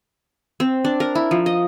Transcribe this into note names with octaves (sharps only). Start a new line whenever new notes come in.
C4
D4
A#4
E4
F3
D#5